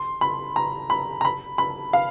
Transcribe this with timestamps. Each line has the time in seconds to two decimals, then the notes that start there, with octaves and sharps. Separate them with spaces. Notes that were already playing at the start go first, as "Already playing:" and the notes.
Already playing: C6
0.21 B5
0.56 A#5
0.90 B5
1.21 A#5
1.25 B5
1.58 B5
1.93 F5